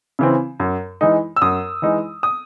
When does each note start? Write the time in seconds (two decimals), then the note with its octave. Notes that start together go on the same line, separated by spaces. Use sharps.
0.19 C#3 E3 C4
0.60 F#2
1.01 E3 G#3 D#4
1.36 E6
1.42 F#2 D#6
1.82 E3 G#3 D#4
2.23 D#6